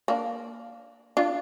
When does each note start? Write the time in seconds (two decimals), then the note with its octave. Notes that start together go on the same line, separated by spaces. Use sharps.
0.08 A#3 D4
1.17 D4 F4